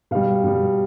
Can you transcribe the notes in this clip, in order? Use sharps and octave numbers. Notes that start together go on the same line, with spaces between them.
B2 G3 F5
B2 G3